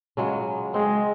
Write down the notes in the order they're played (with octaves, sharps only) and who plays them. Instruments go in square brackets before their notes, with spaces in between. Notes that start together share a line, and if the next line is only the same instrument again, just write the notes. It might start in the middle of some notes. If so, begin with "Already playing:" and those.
[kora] C#3 F#3 G#3
[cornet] G#3 [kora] C4